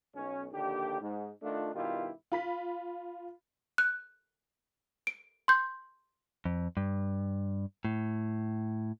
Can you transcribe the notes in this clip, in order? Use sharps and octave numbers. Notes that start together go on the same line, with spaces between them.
B1 C#4
A#1 D#2 D3 G4
G#2
D#3 A3 D4 F4
G2 B2 D#3 E4 F4 G4
F4 B5 B6
F#6
D7
C6 G6
F2
G2
A2